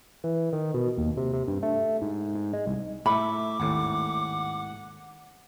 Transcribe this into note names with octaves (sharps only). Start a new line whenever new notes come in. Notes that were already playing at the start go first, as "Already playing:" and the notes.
E3
D#3
B2
D#2
C3
C3
G2
A3
G#2
G#2
G#3
C2
A2 A3 E5 B5 D6
G#1 D#2 A2 F#5